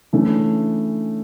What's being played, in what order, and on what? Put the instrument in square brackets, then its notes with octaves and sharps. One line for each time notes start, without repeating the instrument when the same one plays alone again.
[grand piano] C#3 E3 A3 D4